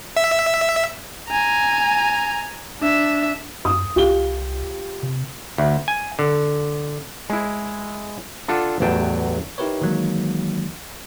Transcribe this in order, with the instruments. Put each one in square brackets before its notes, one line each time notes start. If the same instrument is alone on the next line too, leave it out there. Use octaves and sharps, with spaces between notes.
[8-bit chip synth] E5
[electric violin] G#5 A#5
D4 E5
[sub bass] F#2 [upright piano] D#6
[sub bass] C2 [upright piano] F4 G4 G7
[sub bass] C3
[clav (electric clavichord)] D2
G#5
D3
G#3 E4
D4 F4 A4 F#5
A1 E2 F#3 G5 A5
[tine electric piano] D#4 E4 G4 A#4 B4 C#5
D#3 E3 F#3 G#3 A#3